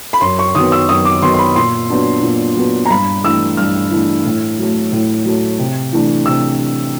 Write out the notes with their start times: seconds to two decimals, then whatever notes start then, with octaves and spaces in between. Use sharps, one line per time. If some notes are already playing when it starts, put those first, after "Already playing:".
0.13 B5
0.21 F#2 C6
0.39 C#6
0.55 D#3 F#3 B3 D#6
0.72 E6
0.89 F#2 D#6
1.05 D6
1.22 D#3 F#3 B3 C6
1.34 C6
1.38 B5
1.56 A#2 C6
1.90 F#3 B3 D4
2.23 A#2
2.56 F#3 B3 D4
2.85 A#5
2.90 G2 B5
3.24 E3 A3 D4 E6
3.57 G2 F6
3.91 E3 A3 D4
4.25 A2
4.59 F#3 A3
4.92 A2
5.25 F#3 A3
5.58 C3
5.93 E3 A3 D4
6.26 C3 E6